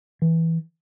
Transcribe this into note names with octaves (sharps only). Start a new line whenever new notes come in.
E3